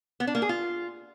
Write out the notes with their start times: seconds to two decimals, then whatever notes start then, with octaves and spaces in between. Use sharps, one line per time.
0.20 B3
0.27 D4
0.35 A#3
0.42 G#4
0.49 F4